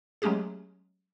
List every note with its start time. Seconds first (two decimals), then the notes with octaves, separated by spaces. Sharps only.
0.22 F#3 G#3 A3 C#4 G4 G#4